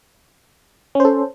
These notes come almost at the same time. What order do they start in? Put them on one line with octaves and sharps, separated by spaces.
C#4 C5 A4